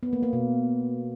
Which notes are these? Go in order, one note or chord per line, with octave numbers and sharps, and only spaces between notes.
B3
A#3
A#3
B2